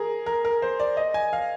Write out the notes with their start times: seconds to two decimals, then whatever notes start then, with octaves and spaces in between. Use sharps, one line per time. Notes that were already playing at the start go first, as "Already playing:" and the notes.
Already playing: G#4 A#4
0.26 A#4
0.45 A#4
0.62 C5
0.80 D5
0.97 D#5
1.14 G#5
1.33 F5